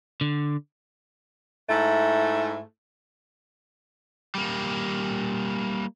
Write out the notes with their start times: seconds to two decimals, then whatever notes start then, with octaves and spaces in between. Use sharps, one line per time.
0.21 D3
1.68 G#2 A3 E4
4.35 G3 A#3